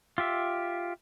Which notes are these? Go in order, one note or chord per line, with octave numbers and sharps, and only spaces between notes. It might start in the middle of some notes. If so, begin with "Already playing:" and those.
F4 G4 E5